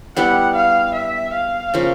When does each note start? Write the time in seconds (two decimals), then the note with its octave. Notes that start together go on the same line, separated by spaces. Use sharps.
0.17 G3 B3 E4 G4 F#5
0.56 F5
0.95 E5
1.34 F5
1.74 C#3 F3 A#3